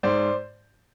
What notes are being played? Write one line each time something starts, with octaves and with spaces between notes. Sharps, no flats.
G#2 C5 D5